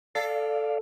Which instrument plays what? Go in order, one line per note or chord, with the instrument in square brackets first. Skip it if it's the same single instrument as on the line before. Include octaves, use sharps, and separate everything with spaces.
[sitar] A4 [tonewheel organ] D5 F5